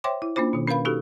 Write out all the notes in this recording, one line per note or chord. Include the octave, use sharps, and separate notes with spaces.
C5 C#5 E5 G5 C6 D6
E4
A#3 C#4 D4 F4 C5
B2 D#3
C#4 A#4 B4 F5 B5
D#4 F#4 G4 A4